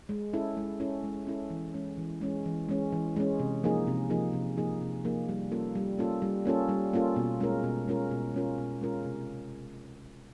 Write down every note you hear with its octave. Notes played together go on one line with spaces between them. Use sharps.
G#3
C#4 E4 A4
G#3
C#4 E4 A4
G#3
C#4 E4 A4
E3
G#3 C#4
E3
G#3 C#4
E3
G#3 C#4
E3
G#3 C#4
C3
F3 A#3 D#4 G#4
C3
F3 A#3 D#4 G#4
C3
F3 A#3 D#4 G#4
C3
F3 A#3 D#4 G#4
G3
A#3 C#4 F4 A4
G3
A#3 C#4 F4 A4
G3
A#3 C#4 F4 A4
G3
A#3 C#4 F4 A4
B2
G#3 C#4 F4 A#4
B2
G#3 C#4 F4 A#4
B2
G#3 C#4 F4 A#4
B2
G#3 C#4 F4 A#4
C3